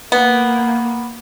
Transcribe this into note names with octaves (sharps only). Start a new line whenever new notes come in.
A#3 B3